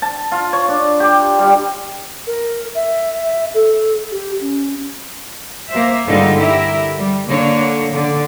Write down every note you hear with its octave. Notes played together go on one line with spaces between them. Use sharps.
A5
F4
C#5
D4
G4
G3
A#4
E5
A4
G4
C#4
A#3 C5 E5
G2 D3 G3 G#3 D#4 F4
E4 G4 A#4 E5
G3
D3 A#3 D4 C#5
D3 D5